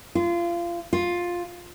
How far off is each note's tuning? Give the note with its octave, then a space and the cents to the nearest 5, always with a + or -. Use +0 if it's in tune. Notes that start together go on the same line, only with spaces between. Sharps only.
F4 -25
F4 +10